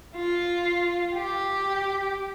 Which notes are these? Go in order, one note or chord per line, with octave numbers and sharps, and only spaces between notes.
F4
G4